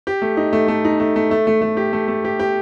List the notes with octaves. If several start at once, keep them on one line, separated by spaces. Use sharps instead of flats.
G4
A3
D#4
A3
A3
D#4
A3
A3
A3
A3
A3
G4
A3
A3
G4
G4